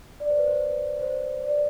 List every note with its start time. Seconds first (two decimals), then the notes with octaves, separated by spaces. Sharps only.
0.20 D5
0.30 C5
0.38 B4
0.47 C5
1.02 C5
1.42 D5